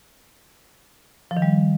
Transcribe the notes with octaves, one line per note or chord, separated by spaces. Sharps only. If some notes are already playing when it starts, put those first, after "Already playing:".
F3
D#3
G3